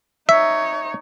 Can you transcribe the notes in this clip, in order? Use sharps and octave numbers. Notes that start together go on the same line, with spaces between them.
D#4 C#5 E5